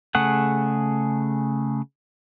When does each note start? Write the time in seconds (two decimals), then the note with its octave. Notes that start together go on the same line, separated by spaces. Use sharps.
0.15 C#3 A3 G#4 F#5